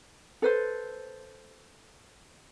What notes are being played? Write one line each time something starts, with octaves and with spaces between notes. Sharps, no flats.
A4 B4 C5